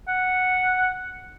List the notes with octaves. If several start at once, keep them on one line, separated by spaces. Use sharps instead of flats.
F#5